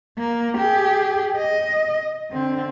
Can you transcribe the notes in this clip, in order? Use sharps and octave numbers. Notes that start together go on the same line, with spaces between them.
A#3
G4 G#4
D#5
D3 C4